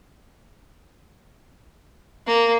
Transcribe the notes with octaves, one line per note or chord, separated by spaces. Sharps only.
A#3